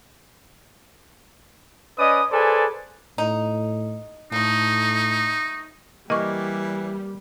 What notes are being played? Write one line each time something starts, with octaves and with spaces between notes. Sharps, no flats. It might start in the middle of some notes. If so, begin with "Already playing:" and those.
C#4 B4 D5 D#5 D#6
G#4 A4 B4 C5 D5 G#5
A2 D#4
A2 F3 A3 D#4
E3 G3 A#3 D#5 C#6